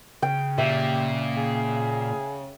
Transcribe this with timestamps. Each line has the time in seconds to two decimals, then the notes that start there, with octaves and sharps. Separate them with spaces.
0.22 C#3 G5
0.58 A#2 G4 E5
1.37 G#4